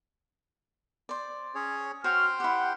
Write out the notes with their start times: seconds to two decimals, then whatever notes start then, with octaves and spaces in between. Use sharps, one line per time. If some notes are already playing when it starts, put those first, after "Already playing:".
1.09 C5 D5
1.55 C#4 G#4 C#5
2.04 F#4 C5 C#5 G5 C6 F6
2.40 E4 G4 F#5